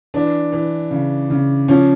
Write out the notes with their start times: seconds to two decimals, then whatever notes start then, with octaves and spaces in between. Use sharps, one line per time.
0.14 E3 D4
0.52 E3
0.91 C#3
1.30 C#3
1.68 F3 C#4